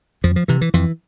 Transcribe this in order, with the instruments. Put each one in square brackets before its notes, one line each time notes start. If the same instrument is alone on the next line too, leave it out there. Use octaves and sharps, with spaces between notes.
[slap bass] F2 F3
F3
C3 E3
E3
F2 E3